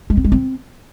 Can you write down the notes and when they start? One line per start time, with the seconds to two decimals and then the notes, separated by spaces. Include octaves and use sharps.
0.10 G#3
0.17 C4
0.24 G#3
0.32 C4